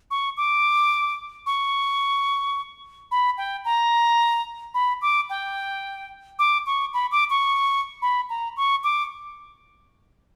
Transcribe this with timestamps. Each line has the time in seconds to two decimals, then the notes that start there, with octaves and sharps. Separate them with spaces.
0.11 C#6
0.37 D6
1.46 C#6
3.11 B5
3.38 G5
3.65 A#5
4.74 B5
5.02 D6
5.30 G5
6.39 D6
6.66 C#6
6.94 B5
7.11 D6
7.30 C#6
8.02 B5
8.30 A#5
8.57 C#6
8.84 D6